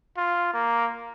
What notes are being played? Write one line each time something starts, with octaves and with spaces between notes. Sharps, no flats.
F4
A#3